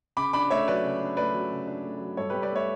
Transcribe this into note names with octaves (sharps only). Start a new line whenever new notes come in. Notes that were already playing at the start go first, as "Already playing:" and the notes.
C#3 B5 D6
D4 B5 D6
A3 C#5 E5
F#3 B4 D5
C#3
D4
A3 B4 D5
F#3
C#3
D4
A3
F#3
G2 A4 C#5
G2 G4 B4
B4 D5
A3 C#5 E5